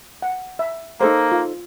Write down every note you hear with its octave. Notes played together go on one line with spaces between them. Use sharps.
F#5
E5
A#3 D#4 A4 C5
F4